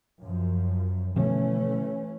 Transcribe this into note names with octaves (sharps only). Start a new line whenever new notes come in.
F#2 F3
B2 D3 E3 F3 A3 C#4